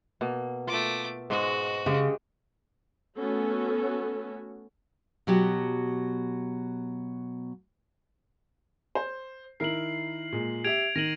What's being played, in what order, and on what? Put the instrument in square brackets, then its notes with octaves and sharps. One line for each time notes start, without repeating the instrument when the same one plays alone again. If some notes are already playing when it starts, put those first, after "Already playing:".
[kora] B2 A#3
[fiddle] A3 D6 [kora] F4
[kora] G#2 G#3 [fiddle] F#4
[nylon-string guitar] C#3 [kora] G#3 G4
[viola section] A3 B3 C#4 F#4 A4
[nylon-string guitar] B2 F#3 G4
[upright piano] C5
[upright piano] D#3 E4 A#4 [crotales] C7 F#7
[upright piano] A#2 G#3
[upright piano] G4 E5 [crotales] G#6 D7 F7
[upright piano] D#3 [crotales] A#6 D#7 F#7